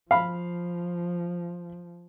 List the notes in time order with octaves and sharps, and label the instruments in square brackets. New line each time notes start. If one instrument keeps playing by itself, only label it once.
[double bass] F3 [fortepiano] F5 B5